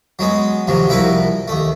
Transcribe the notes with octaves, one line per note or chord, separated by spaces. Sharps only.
F#3 G#3 B3
D#2 C3 F3 F#3
C2 F3 E4 F#4 A#4 B4
D#2 A3